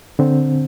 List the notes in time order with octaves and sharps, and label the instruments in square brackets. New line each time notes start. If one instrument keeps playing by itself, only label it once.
[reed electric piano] D3 C4